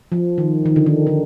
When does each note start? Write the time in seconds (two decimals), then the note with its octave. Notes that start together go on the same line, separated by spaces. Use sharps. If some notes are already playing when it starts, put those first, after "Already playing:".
0.12 F3
0.38 D#3
0.66 D#3
0.76 D3
0.86 D#3
1.07 D3